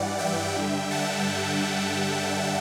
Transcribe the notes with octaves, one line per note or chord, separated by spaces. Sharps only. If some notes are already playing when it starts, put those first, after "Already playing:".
Already playing: G2 E3 G3 D5 F#5
E5 G5
G2 D3 G3
F#5 A5